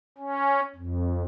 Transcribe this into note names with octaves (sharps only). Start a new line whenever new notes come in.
C#4
F2